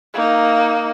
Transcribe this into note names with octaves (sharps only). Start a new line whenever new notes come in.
A#3 D#4